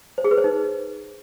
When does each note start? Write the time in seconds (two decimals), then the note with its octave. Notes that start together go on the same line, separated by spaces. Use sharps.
0.18 C5
0.24 G#4
0.31 B4
0.38 C5
0.44 D#4